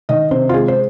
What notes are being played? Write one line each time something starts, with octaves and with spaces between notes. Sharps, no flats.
D#3 D#5
C3 C5
F4
G#3 G#4
C5